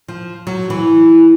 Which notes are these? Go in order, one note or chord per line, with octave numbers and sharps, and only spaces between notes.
F3
F#3
E3